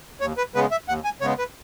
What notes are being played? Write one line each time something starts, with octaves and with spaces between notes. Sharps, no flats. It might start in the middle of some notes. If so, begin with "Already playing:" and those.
D#2 C#5
B4
C#3 G#3 B3 B4
E5
D#2 F#5
G#5
C#3 G#3 B3 C#5
B4